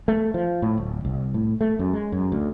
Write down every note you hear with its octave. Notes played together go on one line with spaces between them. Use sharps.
A3
F3
A2
D1
C2
A2
A3
F#2
G#3
F#2
D2